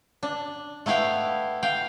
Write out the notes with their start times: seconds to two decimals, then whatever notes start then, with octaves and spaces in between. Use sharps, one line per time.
0.23 D4
0.86 A3 B3 E4 F5 G5
1.63 F5 G5